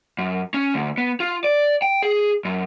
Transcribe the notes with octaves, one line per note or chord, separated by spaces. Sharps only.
F#2
C#4
D2
B3
F4
D5
G5
G#4
F#2